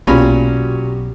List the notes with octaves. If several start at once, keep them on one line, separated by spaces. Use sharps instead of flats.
B1 A#2 B3 C#4 F#4 G4 B5